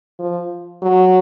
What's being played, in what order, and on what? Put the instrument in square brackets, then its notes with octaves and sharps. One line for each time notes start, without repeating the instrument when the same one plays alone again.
[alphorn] F3
F#3